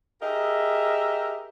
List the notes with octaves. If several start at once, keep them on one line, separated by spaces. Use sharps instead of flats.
G4 G#4 A#4 D#5 E5